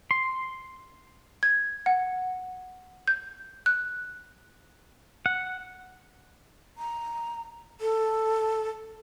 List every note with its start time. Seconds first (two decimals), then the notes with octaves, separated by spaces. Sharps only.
0.11 C6
1.43 G#6
1.86 F#5
3.08 G6
3.66 F#6
5.26 F#5
6.78 A#5
7.81 A4